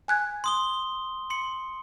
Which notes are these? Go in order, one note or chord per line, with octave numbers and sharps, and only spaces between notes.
G#5 F#6 G#6
C6 D#6 G7
C6 C#7